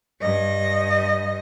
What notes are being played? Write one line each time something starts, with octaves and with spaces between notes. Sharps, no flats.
G2 D#5